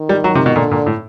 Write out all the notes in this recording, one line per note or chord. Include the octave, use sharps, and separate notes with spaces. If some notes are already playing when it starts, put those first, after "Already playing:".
Already playing: D#3
G3
F#3
C3
B2
A#2 D3
A#2
A2